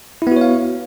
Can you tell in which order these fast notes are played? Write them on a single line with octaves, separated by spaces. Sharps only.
E4 B3 F#4 C#5 F5